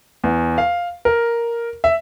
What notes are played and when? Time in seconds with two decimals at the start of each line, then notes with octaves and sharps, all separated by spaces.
0.24 E2
0.58 F5
1.05 A#4
1.84 E5